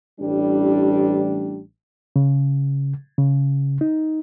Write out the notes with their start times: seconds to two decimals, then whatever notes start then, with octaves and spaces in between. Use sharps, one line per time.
0.20 A1 G3 D4
2.16 C#3
3.18 C#3
3.81 D#4